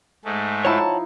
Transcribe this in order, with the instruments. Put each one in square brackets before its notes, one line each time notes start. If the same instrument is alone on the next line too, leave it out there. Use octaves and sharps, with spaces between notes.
[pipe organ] G#2 G#3 A3
[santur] F3 D#4 E4 [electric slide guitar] C#5 F#5 A5